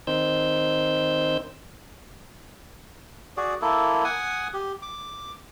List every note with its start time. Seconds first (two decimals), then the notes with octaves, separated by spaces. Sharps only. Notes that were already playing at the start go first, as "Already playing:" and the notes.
0.07 D#3 C4 D#4 C5 E6 G6
3.37 F#4 G#4 D5
3.62 A#3 E4 A4
4.04 F#5 G#5 D#6
4.53 G4
4.82 D6